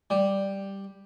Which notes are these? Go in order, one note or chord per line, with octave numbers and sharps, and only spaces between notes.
G3